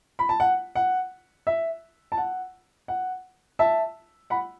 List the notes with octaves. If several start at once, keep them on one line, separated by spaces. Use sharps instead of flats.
B5
A5
F#5
F#5
E5
A5
F#5
F#5
E5 A5
F#5 B5